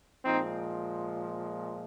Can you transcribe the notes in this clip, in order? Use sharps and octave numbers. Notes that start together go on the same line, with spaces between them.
A#2 F3 G#3 C4 D#4